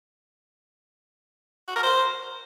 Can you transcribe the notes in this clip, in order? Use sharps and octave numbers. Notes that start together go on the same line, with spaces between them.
F#4
A#4
C5